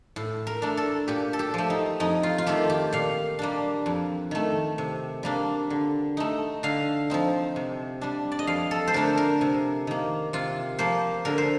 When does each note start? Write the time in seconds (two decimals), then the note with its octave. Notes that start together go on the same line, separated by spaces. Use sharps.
0.16 A2
0.47 A#4
0.62 A3 D4
0.77 A4
1.08 A#2 G4
1.33 A4
1.39 G4
1.54 F3 A3
1.70 D#4
2.00 F2 D#4
2.23 F4
2.38 F4
2.46 D#3 A3 G4
2.70 G4
2.93 A#2 F5
3.39 G3 A#3 D4
3.86 F2
4.31 D#3 A3
4.78 C3
5.23 G3 A#3 D4
5.70 D3
6.17 A3 D#4
6.63 D3 F5
7.10 F3 C4 D#4
7.56 C3
8.01 G3 D4
8.32 D5
8.39 D#5
8.47 F2 F5
8.71 A4
8.88 C5
8.94 D3 A3 D4 A#4
9.17 A#4
9.41 C3
9.87 D#3 A#3
10.33 C3 F4
10.79 F3 A#3 C5
11.25 D3 A#4
11.38 C5